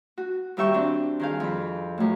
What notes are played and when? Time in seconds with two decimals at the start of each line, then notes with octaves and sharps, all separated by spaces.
0.18 F#4
0.57 D#2 G3 G4 E5 G5 C#6
0.74 C4 D4
1.20 D#3 G#4 F5
1.40 F2 B5
1.98 F#2 A2